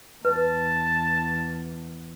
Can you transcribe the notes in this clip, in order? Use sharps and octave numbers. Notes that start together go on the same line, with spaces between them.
E2 B4 A5